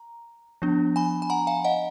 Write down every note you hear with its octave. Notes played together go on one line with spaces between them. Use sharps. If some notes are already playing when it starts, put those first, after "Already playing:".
Already playing: A#5
F3 B3 D4
G#5 B5
G#5
F#5 A#5
F5 G#5
D#5 F#5